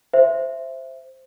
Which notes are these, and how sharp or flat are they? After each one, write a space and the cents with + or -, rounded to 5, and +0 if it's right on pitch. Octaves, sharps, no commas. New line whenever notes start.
C5 +0 E5 +10